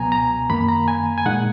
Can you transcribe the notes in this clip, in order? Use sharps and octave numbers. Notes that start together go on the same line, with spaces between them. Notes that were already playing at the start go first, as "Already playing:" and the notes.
Already playing: C#2 B2 F#3 B3 G#5 A#5
A#5
F#2 D#3 A#3 B5
A#5
G#5
G#5
A#2 G#3 D#4 F#5